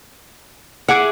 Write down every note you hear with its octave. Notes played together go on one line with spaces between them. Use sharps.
E4 G#4 F#5 D6